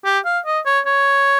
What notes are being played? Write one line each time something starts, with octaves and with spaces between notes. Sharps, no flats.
G4
F5
D#5
C#5
C#5